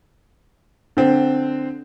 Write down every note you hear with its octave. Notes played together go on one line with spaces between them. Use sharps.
D3 C4